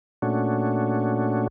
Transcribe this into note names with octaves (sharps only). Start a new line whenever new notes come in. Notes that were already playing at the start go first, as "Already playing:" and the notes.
A#2 A3 C#4 D4 F#4